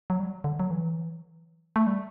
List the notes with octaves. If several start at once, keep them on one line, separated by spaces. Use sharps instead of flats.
F#3
G3
D3
F#3
E3
A3
G3